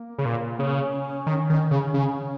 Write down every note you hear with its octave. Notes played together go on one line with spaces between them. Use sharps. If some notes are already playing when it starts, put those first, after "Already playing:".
Already playing: A#3
C#3
A#2
C#3 C#4
D#3
D#3
C#3
C#3 C#4